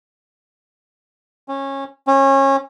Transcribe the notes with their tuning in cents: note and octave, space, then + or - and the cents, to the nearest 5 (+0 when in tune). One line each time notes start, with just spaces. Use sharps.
C#4 -20
C#4 -25